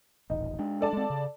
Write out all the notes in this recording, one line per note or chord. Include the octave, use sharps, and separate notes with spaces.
D#1 A1 D#4
G#3 D4
A4 D5 A5
G#3 C4
C#3